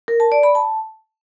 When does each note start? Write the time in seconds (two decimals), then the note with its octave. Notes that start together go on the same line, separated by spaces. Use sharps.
0.08 A#4
0.20 A5
0.32 D5
0.43 B5
0.55 A5